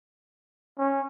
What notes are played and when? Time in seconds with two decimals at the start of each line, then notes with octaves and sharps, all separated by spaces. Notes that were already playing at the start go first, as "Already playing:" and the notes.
0.78 C#4